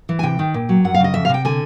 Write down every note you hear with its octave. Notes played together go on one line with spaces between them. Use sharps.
E3
G#5
C3 G5
D#3
A#2
F#3
F#2 F#5
F5
C#3 D#5
F2 E5
F5
C3 G5
D3 G#5